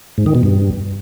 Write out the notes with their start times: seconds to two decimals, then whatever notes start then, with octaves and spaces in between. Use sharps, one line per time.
0.18 G#2
0.26 D#3
0.35 B2
0.43 G2